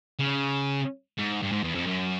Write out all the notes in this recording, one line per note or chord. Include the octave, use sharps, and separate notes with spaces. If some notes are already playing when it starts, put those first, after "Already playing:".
C#3
G#2
G2
G#2
E2
F2
F#2